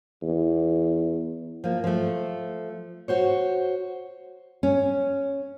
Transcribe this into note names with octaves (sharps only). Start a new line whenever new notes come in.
E2
F3 A#3
F3 A3
F#4 C5 C#5
C#4